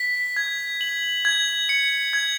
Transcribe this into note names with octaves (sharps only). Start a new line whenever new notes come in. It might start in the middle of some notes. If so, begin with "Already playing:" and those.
Already playing: B6
G#6
F#7
G#6
C#7
G#6